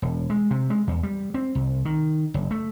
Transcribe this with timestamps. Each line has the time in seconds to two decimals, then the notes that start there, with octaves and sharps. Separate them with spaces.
0.02 E1
0.30 G#3
0.51 C3
0.70 G#3
0.87 E2
1.03 G3
1.34 C4
1.55 C2
1.85 D#3
2.34 F#1
2.51 A3